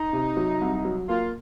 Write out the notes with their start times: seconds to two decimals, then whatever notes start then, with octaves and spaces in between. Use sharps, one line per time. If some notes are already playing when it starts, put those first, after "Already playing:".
Already playing: D#4
0.13 C3
0.37 F#3
0.61 C2
0.85 F#3
1.08 A#3 F4